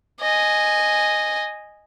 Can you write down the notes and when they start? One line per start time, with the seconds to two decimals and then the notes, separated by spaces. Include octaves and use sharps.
0.20 D#5 G#5